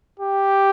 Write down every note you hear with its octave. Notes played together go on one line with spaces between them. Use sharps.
G4